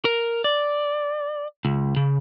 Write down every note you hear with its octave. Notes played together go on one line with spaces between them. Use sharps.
A#4
D5
C#2
C#3